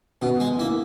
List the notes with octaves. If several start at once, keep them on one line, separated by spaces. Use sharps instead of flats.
B2 B3
G#3
A#3 E4